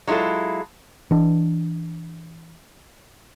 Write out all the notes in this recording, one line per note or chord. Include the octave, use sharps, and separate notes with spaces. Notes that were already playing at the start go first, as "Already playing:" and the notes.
F#3 G#3 E4 F4 A4
E3 D4